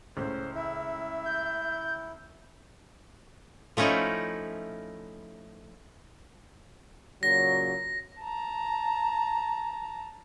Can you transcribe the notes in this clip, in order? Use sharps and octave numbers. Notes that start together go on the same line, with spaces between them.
C#2 A2 C#3 C5
E4 E5
G6
F3 A3 C#4 D#4 E4
A#2 C#3 F#3 A#6
A5 A#5